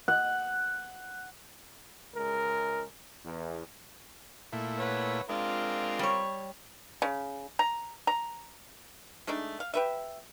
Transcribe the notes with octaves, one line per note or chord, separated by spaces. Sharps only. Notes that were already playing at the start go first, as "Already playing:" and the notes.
F#5
C#2 G#3 A#4
E2
A#2 A3 E4
B4 C#5 F#5
G#3 C4 D4 F4 A#4
G3 C#5
C#3
A#5
A#5
G#3 A3 D4 D#4
F5
G4 B4 E5